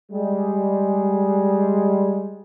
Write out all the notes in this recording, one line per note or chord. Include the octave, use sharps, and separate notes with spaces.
G3 G#3